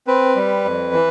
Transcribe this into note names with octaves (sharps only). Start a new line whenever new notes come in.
C4 B4
G3
F2
E3